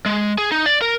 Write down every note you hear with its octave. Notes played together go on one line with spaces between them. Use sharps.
G#3
G#4
D#4
D5
A#4